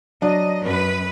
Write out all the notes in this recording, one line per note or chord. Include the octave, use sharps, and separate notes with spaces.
F#3 D4 D#5
F#2 B4